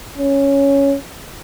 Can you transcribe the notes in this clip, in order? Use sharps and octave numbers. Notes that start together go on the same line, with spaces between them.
C#4